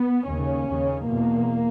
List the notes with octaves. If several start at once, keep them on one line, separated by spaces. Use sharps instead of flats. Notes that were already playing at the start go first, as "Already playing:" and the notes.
Already playing: B3
D#2 C#3 C#4
D#2 C#3
E2 B2 A#3